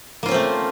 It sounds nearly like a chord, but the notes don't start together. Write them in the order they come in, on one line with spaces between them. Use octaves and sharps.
A#3 F4 C#4 C4 A3